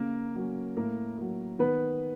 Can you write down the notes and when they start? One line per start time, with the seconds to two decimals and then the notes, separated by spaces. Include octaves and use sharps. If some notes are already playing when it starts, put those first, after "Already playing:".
Already playing: C#3 A#3 A#4
0.35 F#3 A#3 C#4
0.77 A2 A#3 A#4
1.18 F#3 A#3
1.59 D#3 B3 B4